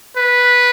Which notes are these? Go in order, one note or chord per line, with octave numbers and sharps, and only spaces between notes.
B4